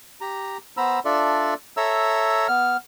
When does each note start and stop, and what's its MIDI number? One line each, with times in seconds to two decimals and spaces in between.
0.21 0.58 67
0.21 0.58 82
0.77 1.00 59
0.77 1.00 72
0.77 1.00 82
0.77 1.00 83
0.77 1.00 88
1.05 1.54 62
1.05 1.54 65
1.05 1.54 69
1.05 1.54 74
1.05 1.54 76
1.77 2.47 69
1.77 2.47 73
1.77 2.47 76
1.77 2.47 82
1.77 2.47 88
2.48 2.77 59
2.48 2.77 89